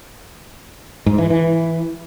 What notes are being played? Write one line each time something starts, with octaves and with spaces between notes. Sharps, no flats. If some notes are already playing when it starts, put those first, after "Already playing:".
G#2
E3
E3